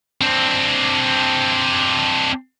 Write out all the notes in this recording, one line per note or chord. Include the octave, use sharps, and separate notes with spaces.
C4 D4